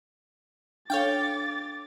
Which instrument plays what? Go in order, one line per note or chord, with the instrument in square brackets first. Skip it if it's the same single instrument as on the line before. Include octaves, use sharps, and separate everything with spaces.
[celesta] D4 A4 [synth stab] C#5 F5 G5 [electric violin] D6 A6